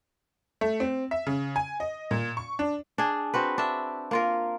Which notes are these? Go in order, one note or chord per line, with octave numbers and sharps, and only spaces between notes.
A3
C4
E5
C#3
G#5
D#5
A#2
C#6
D4
D4 G#4
C4 F#4 B4
D4 E5
A#3 F4 A#4